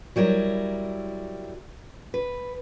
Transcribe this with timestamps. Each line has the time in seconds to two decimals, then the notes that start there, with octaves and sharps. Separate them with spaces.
0.16 F#3 G3 E4 A#4
2.14 B4